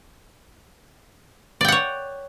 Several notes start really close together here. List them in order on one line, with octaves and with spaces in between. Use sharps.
D5 G5 F#5 C#5